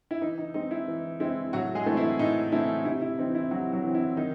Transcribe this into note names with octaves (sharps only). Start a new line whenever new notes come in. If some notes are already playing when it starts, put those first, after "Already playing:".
E4
E3 D#4
D#4
G#3 C4 D#4
E4
E3
G#3 C4 E4
A2 F#3 F#4
G#3 G#4
E3 A3 C4
E4
A2 D#4
E3 A3 C4 E4
C3 E4
E4
E3 C4 D#4
E4
C3 F#3 F#4
F#3 F#4
E3 C4
E4
D#3 D#4